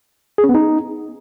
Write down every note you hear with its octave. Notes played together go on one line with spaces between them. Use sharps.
G#4
C#4
B3
D#4